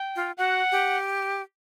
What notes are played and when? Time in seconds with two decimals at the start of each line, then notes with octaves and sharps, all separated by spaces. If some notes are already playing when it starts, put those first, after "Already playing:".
Already playing: G5
0.16 F4
0.38 F#4 F#5
0.72 G4